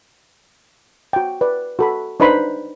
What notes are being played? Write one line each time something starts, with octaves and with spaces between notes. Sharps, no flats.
F#4 G5
B4 D5
F#4 A4 B5
D4 D#4 B4 C5 B5 C6